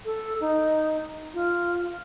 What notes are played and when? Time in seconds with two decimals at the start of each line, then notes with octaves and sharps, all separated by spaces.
0.05 A4
0.40 D#4
1.34 F4